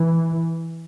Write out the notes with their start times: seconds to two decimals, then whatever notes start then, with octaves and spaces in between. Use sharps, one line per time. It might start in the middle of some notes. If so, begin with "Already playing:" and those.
Already playing: E3